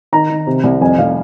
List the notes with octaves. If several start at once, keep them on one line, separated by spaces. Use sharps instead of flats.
D#3 A#5
D#3
C3
C2
F2 G#5
F1 F5